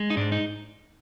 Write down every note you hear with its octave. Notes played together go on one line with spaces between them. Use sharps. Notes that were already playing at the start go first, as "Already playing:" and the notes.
Already playing: G#3
D#4
G#2 D4
D#4